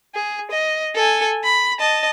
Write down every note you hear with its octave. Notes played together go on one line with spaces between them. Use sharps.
G#4
D#5
A4 G#5
B5
D#5 A5